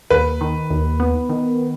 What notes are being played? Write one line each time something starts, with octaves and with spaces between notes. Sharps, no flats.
D#2 B4
D#3
D#2
B3
D#3